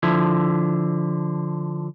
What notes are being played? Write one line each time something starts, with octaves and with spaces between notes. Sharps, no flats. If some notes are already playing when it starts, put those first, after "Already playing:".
D3 F3 E4